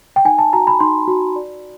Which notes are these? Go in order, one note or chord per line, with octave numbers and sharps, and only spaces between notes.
G5
D#4 G#5
A5
F#4 A#5
B5
D#4 C6
F#4
D5